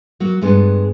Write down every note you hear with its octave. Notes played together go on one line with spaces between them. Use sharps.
F#3 A#3 F#4
G2 G#3 B3 D4